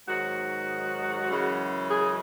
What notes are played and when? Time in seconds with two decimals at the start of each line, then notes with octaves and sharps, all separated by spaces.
0.08 G#2 D#3 F#3 F#4
1.30 F#2 C#3 E3 G#3
1.89 G#4